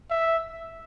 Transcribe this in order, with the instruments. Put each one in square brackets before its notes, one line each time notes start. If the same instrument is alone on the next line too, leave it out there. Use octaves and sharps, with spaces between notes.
[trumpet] E5